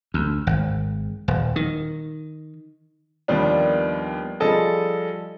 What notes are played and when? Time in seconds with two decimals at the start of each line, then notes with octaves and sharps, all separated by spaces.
0.14 D2
0.47 G#1
1.28 D#1
1.56 D#3
3.28 D#2 D#3 F3 G3 B3 D4
4.40 F3 G3 G#4 A4 D#5